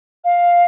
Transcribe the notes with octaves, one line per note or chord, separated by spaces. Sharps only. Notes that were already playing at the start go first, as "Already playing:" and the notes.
F5